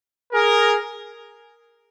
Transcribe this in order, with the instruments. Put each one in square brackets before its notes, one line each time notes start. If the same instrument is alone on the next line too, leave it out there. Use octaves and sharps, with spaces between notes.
[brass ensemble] G#4 A#4